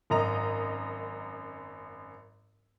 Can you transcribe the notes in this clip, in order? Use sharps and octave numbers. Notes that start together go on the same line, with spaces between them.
G#1 F#2 D#5 A#5